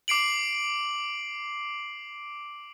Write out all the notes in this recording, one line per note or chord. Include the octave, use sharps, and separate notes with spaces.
D6 C7 D7 F#7